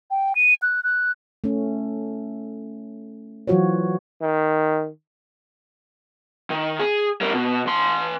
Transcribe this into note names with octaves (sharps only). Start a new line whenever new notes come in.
G5
D#7
F#6
F#6
A3 C#4
E3 F#3 F4 F#4 C5 C#5
D#3
D#3
G#4
G3 A#4
B2
E3 C6